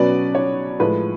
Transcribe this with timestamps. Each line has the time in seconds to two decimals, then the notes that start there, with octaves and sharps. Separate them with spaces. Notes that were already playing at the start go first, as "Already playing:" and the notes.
Already playing: B2 F#3 C#4 B4 D5
0.35 C#5
0.80 A2 F3 G#3 B4